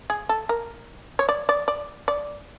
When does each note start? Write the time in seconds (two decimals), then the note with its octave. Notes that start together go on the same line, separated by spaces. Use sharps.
0.10 G#4
0.29 A4
0.49 A#4
1.19 C#5
1.29 D5
1.49 D5
1.68 D5
2.08 D5